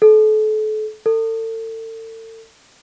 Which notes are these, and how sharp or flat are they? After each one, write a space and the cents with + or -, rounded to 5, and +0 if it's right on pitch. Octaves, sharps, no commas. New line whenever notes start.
A4 -35
A4 +35